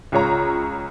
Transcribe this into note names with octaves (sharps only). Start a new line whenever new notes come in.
C#2 F4 C#5 A#5